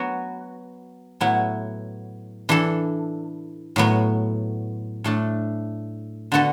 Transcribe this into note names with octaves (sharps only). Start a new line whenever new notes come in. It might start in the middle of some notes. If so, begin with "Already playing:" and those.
Already playing: F#3 B3 F#4
A2 F#3 B3 E4
E3 D4 A4
A2 F#3 B3
A2 A3 D4
D3 B3 F#4 A4